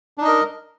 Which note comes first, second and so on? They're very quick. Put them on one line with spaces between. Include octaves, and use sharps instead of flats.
D4 D#4 D#5 A#4